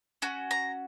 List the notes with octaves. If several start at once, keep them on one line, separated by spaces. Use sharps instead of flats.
C#4 F#4
A#5